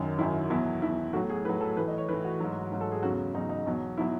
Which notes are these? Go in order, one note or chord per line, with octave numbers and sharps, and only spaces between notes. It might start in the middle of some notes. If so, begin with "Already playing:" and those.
Already playing: F#2 D#3 F#3
F#2 D#3 F#3 E4
E2 B2 F#3 E4
E2 B2 F#3 E4
A2 F#3 F#4
G#4
A2 F#3 B4
A4
A2 E3 B4
D#5
C#5
A2 E3 B4
F#4
G#2 F#3
G#2 F#3
A4
G#4
E2 C#3 F#3 F#4
E2 C#3 F#3 D#4
D#4
E2 B2 F#3
B2 F#3 E4